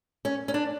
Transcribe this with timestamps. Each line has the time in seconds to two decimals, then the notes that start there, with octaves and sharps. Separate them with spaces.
0.25 C#4
0.48 C#4
0.54 D4